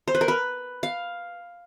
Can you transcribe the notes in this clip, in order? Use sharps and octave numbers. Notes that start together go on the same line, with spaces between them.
C5
B4
A#4
B4
F5